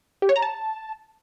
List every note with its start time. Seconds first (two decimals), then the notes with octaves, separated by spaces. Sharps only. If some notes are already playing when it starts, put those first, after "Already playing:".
0.22 G4
0.29 C#5
0.36 A#5
0.42 A5